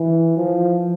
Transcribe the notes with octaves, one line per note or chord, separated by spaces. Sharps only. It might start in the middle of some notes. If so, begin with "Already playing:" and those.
Already playing: E3
F3